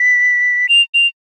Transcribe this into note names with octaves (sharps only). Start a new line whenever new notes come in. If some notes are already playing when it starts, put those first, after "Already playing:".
Already playing: B6
F7
F7